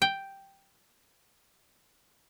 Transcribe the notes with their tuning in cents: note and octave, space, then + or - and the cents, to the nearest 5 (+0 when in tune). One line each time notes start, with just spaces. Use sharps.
G5 +0